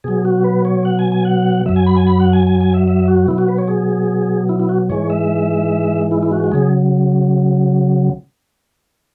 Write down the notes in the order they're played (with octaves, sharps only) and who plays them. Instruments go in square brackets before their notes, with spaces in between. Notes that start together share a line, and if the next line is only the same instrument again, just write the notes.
[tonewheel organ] B2 F#3 G#4
F#4
B4
C#5
F#5
G#5
G#5
F#5
F#2 F#3 E5
G#5
B5
G#5
B5
F#5
G#5
G#5
G#5
E5
E5
F#4
B2 F#3 E4
F#4
B4
C#5
G#4
E4
E4
F#4
G#2 E3 G#3 C#5
E5
E4
E4
F#4
F#4
C#3 F#3 G#4